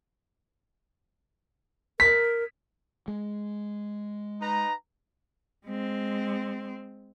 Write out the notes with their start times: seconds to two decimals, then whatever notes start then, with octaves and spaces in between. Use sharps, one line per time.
2.00 A#4 B6
3.08 G#3
4.41 D#4 B4 A#5
5.66 G#3 C4